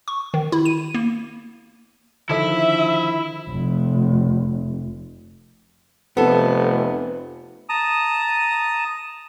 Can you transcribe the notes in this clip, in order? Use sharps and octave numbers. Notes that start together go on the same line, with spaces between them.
C#6
D#3
E4
D#7
A#3
D3 D#3 F3 E4 A4 E5
F1
F1 B3 A4
A5 A#5 D#6